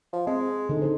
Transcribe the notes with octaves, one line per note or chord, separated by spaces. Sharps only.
F3
G#3 C4
D3 D#4 A4
D#4 G#4 C5